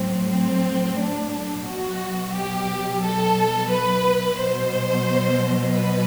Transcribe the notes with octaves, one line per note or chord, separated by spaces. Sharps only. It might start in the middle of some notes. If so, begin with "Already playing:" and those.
Already playing: A2 F#3 C4
C4
D4
B2 F#3 F#4
G4
A4
B4
B2 F#3 C5
B4